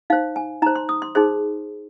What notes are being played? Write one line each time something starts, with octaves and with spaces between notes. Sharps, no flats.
D#4 C5 F5
G#5
D#4 C5 A#5
C6
D#6
C6
D#4 G#4 C5 C6